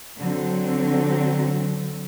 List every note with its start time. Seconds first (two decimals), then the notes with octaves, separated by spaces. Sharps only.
0.19 D3 F#3 C4